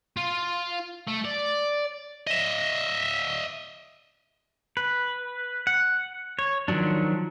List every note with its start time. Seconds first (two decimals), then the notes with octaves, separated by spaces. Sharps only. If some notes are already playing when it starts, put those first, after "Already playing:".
0.17 F4
1.08 A3
1.25 D5
2.27 D#5 E5
4.77 B4
5.67 F#5
6.39 C#5
6.68 D#3 F3 F#3 D4